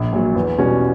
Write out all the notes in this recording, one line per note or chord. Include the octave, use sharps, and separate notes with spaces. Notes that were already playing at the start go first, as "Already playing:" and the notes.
Already playing: A#1
A#2 F#3
E2
B2 G3 C#4 F#4